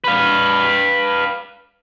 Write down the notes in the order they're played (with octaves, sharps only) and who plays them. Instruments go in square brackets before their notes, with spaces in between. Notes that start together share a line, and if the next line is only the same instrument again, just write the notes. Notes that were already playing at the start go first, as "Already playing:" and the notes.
[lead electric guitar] B4 F5